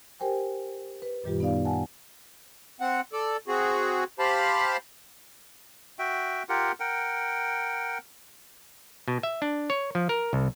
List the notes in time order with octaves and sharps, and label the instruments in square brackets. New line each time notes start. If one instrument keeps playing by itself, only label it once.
[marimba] G4 A#4 C5 G5 G#5
B4
F#2 A#2 D#3 G3 F4 G4
B3 D#4 D5 F5
F#5 G#5 A5
[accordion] C4 F#5
A4 D5
C4 F#4 G#4
G4 C5 F5 A5 B5
[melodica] F#4 E5 G5
F4 G4 A#4 F#5
A#4 F#5 G5
[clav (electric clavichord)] B2
E5
D4
C#5
F3
A#4
C2